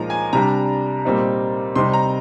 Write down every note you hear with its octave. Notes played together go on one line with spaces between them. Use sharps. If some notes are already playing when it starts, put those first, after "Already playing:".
Already playing: A#2 F3 G#3 D#4 A#5
G#5
C3 G3 D4 A#5
A#2 G3 C4 D#4
C3 G3 C4 D#4 C6
A#5